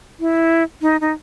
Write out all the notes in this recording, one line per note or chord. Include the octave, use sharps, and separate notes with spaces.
E4
D#4
D#4